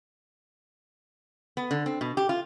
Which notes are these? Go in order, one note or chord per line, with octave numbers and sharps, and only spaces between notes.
B3
D3
C4
B2
G4
F4